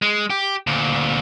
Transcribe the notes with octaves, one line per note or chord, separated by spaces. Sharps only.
G#3
G4
D2 A#2